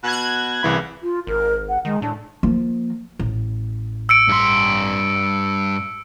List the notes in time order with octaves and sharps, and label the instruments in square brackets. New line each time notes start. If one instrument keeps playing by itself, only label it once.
[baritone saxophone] B2 [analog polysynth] F#6 G#6
[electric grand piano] C2 E3 B5 [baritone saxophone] C#3
[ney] F4
[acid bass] G#1 [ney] A#4
[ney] F#5
[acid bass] D#3 [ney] G#3
[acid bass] A2 [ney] D4
[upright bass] F3 A#3
A1
[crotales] E6 C#7 D7
[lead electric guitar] G2 C6